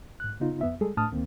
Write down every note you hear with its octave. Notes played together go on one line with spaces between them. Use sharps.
G#2 F#6
C#3 B3 D#4 F4
F2 B3 E5
G3 G#3 G#4 A4
A2 A3 D4 A5 D#6 F6
D2 D#3 A#3 C4